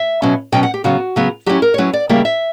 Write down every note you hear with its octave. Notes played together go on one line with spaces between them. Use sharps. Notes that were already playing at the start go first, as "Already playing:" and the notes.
Already playing: E5
B2 F#3 C#4
B2 F#3 C#4 G5
F#5
G4
C#3 F#3 B3 F#4
C#3 F#3 B3
F#3 C#4 E4 G4
A#4
C#5
F#3 C#4 E4 B4
D5
C#3 G3 A#3 E4 E5
E5